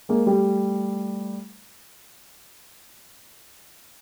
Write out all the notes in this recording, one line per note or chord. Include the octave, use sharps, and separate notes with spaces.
G#3 A#3
G3 A3